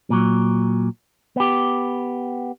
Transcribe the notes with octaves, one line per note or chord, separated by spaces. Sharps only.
A#2 F#3
B3 G4